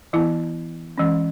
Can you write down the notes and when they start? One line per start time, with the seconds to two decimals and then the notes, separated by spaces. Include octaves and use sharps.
0.13 E3 B3 E4
0.98 E3 G#3 C#4